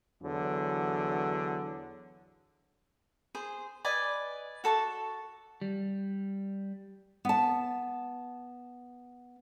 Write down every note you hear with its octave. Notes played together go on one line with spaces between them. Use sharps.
E2 D3 F#3
G#4 C5
B4 D5 D#5 G#5
F#4 A4 A5 C#6
G3
B3 A5